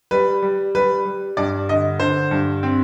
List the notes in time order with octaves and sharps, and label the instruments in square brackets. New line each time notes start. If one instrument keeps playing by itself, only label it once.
[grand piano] G3 B4
G3
G3 B4
G3
G2 D5
D3 D#5
D3 C5
G2
C4